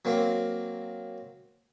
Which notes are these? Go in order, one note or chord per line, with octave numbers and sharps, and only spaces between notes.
F#3 A#3 C4